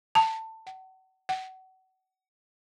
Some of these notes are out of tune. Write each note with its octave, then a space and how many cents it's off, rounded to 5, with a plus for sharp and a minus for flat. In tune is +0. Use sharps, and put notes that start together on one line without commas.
A5 +20
F#5 +35
F#5 +30